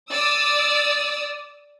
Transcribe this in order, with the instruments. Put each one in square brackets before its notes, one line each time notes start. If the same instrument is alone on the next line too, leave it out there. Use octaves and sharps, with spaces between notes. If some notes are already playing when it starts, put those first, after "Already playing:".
[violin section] D5 D#6 E6